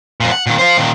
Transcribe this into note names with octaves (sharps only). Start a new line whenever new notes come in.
F2 A#2
F#5
A#2 D#3
C5 F5
A#2 D#3